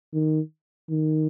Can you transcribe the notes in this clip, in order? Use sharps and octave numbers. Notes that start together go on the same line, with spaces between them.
D#3
D#3